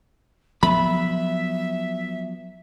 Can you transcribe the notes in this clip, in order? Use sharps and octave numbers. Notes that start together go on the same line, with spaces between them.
F3 F#3 B3 E5 B5